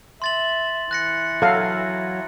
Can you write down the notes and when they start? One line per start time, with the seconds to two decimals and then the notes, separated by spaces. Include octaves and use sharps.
0.22 E5 C6 A6 F#7
0.91 E3 F#6 A#6 C#7
1.42 F#3 A4 F5